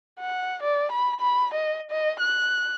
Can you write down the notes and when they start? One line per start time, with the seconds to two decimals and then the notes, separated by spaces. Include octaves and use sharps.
0.19 F#5
0.63 D5
0.92 B5
1.20 B5
1.54 D#5
1.91 D#5
2.20 F#6